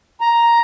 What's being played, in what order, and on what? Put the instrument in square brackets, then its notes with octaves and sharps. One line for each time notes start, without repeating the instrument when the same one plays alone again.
[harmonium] A#5